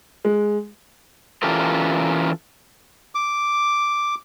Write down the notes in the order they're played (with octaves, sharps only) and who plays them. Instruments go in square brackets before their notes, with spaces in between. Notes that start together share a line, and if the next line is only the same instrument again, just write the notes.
[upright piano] G#3
[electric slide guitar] E3 C#4 F4 G4 A4 A#4
[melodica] D6